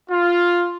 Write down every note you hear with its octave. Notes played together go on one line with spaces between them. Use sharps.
F4